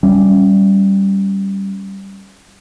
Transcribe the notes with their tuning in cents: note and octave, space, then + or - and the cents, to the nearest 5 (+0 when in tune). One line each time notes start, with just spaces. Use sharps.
G3 -5 C#4 +0